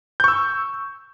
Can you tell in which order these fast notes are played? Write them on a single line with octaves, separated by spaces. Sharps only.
G6 C#6 E6